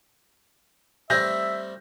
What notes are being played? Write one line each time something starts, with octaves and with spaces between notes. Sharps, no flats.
G3 A3 C4 E5 G6 A#6